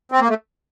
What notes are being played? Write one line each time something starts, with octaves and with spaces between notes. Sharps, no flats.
C4
A#3
A3